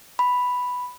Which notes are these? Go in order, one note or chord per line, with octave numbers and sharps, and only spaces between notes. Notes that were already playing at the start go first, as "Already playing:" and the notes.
B5